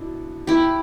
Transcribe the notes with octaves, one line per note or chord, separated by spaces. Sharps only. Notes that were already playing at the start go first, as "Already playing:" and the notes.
Already playing: B2 D4 E4
E4 G4